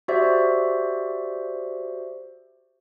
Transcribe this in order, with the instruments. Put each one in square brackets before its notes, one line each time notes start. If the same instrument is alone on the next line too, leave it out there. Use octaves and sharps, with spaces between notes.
[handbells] F#4 G4 C5 D5 E5